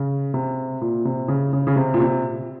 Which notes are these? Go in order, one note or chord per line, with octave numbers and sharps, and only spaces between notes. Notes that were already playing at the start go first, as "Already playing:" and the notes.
Already playing: C#3
C3
A#2
C3
C#3
C#3
C#3
C3
A#2
C3